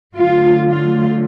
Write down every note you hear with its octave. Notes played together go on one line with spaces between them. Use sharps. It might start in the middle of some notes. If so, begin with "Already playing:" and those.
D3 F#3 A3 F4
F4